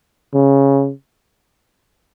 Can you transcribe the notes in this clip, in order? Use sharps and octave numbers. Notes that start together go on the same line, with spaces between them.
C#3